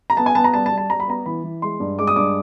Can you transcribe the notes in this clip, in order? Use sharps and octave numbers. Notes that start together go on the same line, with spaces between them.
A#5
B3 A5
G#5
B3 A5
A#5
G3 A5
A5
G3
A5
G3 A#5
B5
B3 A#5
E3 B5
E3
G#3 C6
G2
G#3 D6
D#6
G2 D6